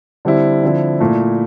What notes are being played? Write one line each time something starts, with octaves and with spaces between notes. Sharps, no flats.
D3 G3 C4 E4
D3 F3 C4 E4
A#2 A3 E4